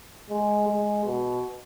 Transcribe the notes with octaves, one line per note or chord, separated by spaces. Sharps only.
G#3
G#3
B2